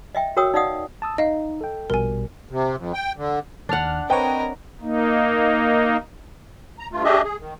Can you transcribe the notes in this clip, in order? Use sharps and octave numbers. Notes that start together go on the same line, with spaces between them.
D#5 E5 G5
F#4 A#4 C#5 G5 D#6 E6
D#4 D5 D#5 F5 F#5 D#6
A5 D#6 E6
D#4 D#5 F5
A4 G5
A#1 B2 G3 A#4 G#5
C3
F2
G5
D3
D#2 D4 F#5 F6
C4 A#4 B4 C#5 D#5 G5
A#3 D#4
A#5
G2 A3 F4
A3 D4 G4 G#4 D#5 E5
G#4
D#3